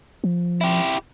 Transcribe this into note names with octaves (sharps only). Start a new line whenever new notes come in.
F3
E4 G4